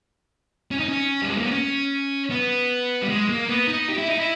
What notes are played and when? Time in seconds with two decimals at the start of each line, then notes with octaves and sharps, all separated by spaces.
0.71 C#4
0.80 D#4
0.89 C#4
1.22 G3
1.29 G#3
1.37 A#3
1.44 B3
1.51 C#4
2.30 B3
3.02 G3
3.09 G#3
3.29 A#3
3.49 B3
3.68 D#4
3.89 G4
3.98 E4
4.08 D#4
4.18 E4